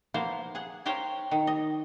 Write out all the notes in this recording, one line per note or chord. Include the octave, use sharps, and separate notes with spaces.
F3 A#3 B3 C5 F5
G#4 F#5
G4 A#4 C5 C#5 F5
D#3
D#5